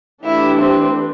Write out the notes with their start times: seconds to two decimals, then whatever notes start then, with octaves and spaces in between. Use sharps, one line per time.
0.24 E3 A3 D4 E4 G4 B4
0.60 C4